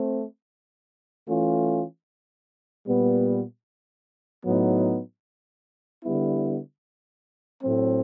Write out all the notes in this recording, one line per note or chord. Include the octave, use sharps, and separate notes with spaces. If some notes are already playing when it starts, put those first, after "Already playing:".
Already playing: A3 C4
E3 A3 C#4 F4
A#2 G3 B3
A2 F#3 B3 D#4
D3 G3 B3 E4
A2 F#3 A3 C4